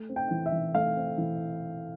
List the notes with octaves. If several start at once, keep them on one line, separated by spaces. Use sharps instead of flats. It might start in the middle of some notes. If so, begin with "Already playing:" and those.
Already playing: A3
C4
G5
E3
E5
E3
A3 F5
C4
E3